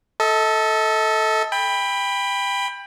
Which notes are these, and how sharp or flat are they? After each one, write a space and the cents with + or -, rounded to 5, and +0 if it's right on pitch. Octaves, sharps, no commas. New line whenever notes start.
A4 +0 D#5 +40
G5 +25 B5 +0